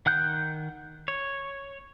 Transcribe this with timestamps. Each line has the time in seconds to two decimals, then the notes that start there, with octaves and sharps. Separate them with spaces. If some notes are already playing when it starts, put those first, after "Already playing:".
0.06 D#3 F#5 F#6 G6
1.08 C#5